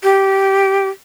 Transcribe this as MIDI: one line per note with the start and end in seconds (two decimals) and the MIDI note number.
0.03 0.89 67